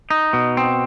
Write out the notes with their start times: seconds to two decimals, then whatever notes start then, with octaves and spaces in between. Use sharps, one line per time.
0.11 D#4
0.33 B2
0.57 C4